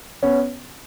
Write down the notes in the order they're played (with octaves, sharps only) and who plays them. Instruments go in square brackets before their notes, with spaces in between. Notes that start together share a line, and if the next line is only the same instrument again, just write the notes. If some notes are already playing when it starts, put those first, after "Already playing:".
[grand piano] B3 C#4